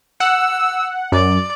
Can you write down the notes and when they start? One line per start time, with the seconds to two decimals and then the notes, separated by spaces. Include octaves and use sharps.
0.20 F#5 E6
1.12 F#2 D5